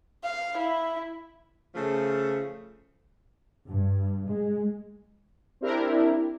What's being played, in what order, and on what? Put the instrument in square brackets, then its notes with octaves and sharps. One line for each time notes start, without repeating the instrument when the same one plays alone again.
[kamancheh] F5
E4
[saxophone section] C#3 F3 A3
[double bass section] G2
G#3
[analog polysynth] C4 D4 E4 G4 A#4